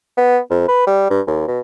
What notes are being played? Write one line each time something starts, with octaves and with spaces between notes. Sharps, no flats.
B3
F2
B4
G3
G2
D#2
B2